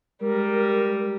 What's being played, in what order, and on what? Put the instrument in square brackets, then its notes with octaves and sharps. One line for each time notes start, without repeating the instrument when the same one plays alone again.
[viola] G3 [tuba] G#3 [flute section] A#4